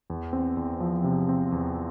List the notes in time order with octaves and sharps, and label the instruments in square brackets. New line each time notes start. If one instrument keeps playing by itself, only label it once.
[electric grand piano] E2
C4
E2
F3
C3
C4
E2